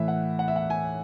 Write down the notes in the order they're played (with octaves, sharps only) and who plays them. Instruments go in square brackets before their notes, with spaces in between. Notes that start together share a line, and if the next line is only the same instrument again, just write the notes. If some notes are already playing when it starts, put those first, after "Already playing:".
Already playing: [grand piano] A2 E3 E5
F#5
F#5
E5
F#5
G#5